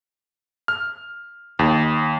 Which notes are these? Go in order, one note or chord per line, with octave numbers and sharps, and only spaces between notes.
F6
D#2